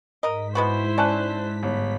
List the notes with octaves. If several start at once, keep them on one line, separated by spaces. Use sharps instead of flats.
G#2 A#4 D#5 B6
G#3 B3 E4 F#4 C5
C#4 D5 A5 F#6
G1